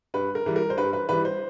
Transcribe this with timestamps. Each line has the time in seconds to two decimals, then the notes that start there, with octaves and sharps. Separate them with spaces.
0.14 G2 B4
0.35 A#4
0.46 E3 G3
0.56 A#4
0.70 C5
0.77 G2 B4
0.93 B4
1.09 E3 G3 B4
1.25 C5